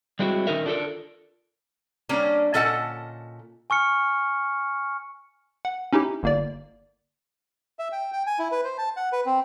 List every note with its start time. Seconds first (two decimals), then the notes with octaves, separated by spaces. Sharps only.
0.19 G3 G#3 C4 E4 F#4
0.47 D#3 C#4 D#4 A#4 E5
0.66 D4 F4 F#4 A4 A#4
2.09 G3 A#3 C#4 D4
2.54 A#2 C#4 A4 D#5 F#5 A5
3.70 G#5 C#6 F6 C#7
5.65 F#5
5.93 C#4 D#4 E4 G4
6.23 G1 A#3 D5
7.79 E5
7.92 G5
8.13 G5
8.26 G#5
8.39 E4
8.52 B4
8.64 C5
8.78 A5
8.97 F#5
9.12 B4
9.26 C4